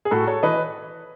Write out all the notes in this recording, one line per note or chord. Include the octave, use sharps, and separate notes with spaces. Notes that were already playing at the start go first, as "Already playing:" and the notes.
G#4
A2 F#4 A4
A4 C#5
E3 B4 D#5